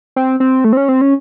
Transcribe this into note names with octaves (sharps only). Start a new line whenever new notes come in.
C4
C4
A3
C4
C#4
C4
C#4